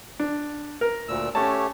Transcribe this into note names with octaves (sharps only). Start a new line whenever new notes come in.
D4
A#4
D2 A#2 E6
A3 C#4 G4 C#5 A5